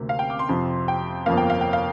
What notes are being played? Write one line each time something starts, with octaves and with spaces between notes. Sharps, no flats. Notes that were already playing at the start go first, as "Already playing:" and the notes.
Already playing: D2 C3 A#3
F5
G5
D6
C6
F2 C3 F3
G5
G1 F2 F3 A#3 F5
G5
F5
G5
F5